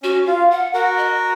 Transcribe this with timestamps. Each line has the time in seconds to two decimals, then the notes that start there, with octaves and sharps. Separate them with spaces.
0.03 C#4 F#4
0.26 F4 F5
0.51 F#5
0.74 F#4 A#4 F#5
0.97 D#5